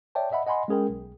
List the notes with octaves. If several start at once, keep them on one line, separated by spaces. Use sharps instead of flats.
C#5 D5 E5 G5 A5
D#5 E5 F#5 B5
D#5 F#5 G#5 B5 C6
G#3 C#4 G#4 A#4 G5
B1